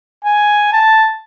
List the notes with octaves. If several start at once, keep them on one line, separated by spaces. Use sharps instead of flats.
G#5
A5